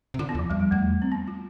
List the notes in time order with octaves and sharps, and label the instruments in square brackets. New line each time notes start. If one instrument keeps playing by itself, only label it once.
[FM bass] C3
[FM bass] D3 [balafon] F4
[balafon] B3
[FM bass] E2
[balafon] F3
[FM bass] F2 [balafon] G3
[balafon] G3
[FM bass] F2 [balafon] A3
[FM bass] E2
[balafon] C4
B3
F4